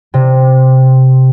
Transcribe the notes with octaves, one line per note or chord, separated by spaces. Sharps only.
C3